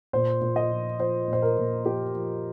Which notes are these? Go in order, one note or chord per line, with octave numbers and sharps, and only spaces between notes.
A#2 C5
A#2
D#5
F3
F3 C5
A#2
C5
A#4
A#2
F3 G4
F3